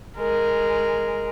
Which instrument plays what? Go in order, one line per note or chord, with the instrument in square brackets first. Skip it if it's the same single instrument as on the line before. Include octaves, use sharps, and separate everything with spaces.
[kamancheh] G#3 A#4